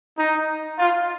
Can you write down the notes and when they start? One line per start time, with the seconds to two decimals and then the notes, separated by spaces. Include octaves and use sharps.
0.17 D#4
0.79 F4